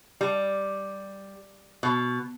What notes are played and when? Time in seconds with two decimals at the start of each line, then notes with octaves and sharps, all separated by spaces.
0.21 G3
1.83 B2